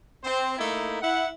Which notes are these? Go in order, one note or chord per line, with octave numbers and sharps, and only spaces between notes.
C4 C5
A3 A#3 D#4 E4
E4 F#5